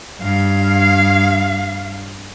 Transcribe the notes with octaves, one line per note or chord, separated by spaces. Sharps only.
G2 F5